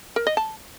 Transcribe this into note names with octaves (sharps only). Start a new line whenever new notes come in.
A#4
D#5
A5